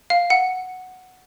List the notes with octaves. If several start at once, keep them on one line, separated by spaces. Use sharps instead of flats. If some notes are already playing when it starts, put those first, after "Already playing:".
F5
F#5